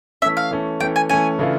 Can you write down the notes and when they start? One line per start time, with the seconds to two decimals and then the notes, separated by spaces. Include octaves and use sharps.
0.22 E3 A3 C#4 E5
0.37 F5
0.51 E3 A3 C#4
0.80 E3 A3 C#4 G5
0.96 G#5
1.09 E3 A3 C#4 G#5
1.39 C#3 E3 A3 D4 F4